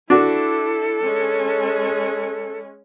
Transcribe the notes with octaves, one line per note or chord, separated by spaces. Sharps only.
D4 E4 F#4 A4
G#3 C#4